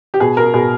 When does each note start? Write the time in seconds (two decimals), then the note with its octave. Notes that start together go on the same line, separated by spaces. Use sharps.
0.14 G4
0.20 B2 G#4
0.37 B2 A#4
0.54 B2 G#4